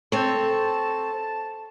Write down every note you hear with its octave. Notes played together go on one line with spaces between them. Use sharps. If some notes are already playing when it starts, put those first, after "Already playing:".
C4 A4 C5 C#5 A5